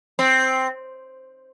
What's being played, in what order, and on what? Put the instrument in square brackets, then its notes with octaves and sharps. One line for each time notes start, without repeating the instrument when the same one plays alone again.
[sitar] C4